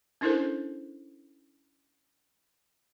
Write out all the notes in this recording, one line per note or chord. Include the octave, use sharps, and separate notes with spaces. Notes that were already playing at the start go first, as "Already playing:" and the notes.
C#4 D4 E4 A4 A#4 C5